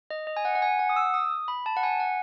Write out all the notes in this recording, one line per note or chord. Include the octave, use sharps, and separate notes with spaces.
D#5
D#5
G#5
F#5
F#5
G#5
F#5
D#6
E6
D#6
B5
A5
F#5
G#5
F#5